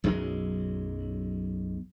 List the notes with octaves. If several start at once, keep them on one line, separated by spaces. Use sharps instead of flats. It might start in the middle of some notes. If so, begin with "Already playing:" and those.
B1 F#2 F#3 G#3